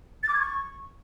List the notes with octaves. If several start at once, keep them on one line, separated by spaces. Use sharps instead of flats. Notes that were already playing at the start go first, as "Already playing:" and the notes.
A6
D6
G#6
C#6